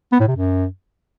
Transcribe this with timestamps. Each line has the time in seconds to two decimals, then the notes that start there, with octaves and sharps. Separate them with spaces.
0.12 B3
0.20 A2
0.28 C3
0.36 F#2